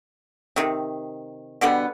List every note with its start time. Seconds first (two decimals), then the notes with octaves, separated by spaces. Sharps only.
0.56 C3 D#3
1.61 B2 D3 G3 B3